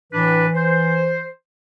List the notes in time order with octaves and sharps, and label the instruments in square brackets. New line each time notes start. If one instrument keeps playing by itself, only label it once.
[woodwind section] A2 D4 B4 [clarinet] E3
[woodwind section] C5